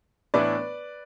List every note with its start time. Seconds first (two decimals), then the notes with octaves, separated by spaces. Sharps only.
0.34 A2 E3 B3 D4 B4 D5